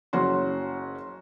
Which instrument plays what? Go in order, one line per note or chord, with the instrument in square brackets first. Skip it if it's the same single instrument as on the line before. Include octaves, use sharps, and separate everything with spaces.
[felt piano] F#1 C#4 F#4 C6